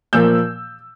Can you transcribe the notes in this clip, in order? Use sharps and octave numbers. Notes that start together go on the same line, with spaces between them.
A#2 F3 A#3 E6 G6